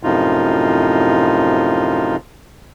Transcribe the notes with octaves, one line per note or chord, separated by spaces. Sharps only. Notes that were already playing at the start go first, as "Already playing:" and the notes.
F#2 A2 C3 F3 D#4 F4